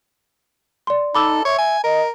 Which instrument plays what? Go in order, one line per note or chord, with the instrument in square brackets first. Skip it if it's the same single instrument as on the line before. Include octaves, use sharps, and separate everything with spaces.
[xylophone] D5 C6
[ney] D#4 [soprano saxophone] A4 [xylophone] B5 D6 E6
[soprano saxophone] C#5 [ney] E5
[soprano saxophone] G#5
[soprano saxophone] A#4 [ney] D#5